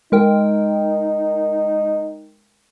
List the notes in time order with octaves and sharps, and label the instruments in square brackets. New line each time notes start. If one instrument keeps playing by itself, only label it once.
[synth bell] G#3 A#4 G5 [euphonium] D#4